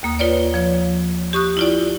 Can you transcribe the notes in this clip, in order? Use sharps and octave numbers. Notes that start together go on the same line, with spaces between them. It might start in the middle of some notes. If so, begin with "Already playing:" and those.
D#2 A#3 D#6
F4 B4 C#5 D5
F3 C#5
G4 C#6 D#6 F#6
E4 F4 D5